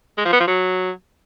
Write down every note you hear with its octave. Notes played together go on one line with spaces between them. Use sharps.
G#3
F3
B3
F3
F#3